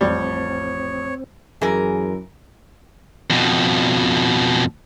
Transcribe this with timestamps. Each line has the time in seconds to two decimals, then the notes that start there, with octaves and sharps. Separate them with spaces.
0.01 A1 F2 G3 C4 C#5
1.61 F#2 E3 G#4 A#4
3.30 F2 B2